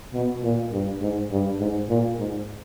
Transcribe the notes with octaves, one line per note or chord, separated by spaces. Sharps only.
B2
A#2
G2
G#2
G2
G#2
A#2
G#2